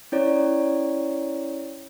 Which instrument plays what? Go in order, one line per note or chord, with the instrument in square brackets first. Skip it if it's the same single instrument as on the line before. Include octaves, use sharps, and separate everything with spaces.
[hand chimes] C#4 E4 C#5 D5